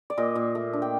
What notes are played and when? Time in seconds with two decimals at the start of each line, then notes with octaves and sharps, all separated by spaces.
0.10 D5
0.18 A#2 D#5
0.35 A#2
0.55 A3
0.73 D4
0.82 G5